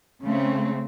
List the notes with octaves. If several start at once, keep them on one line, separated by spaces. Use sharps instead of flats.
C#3 A3 C4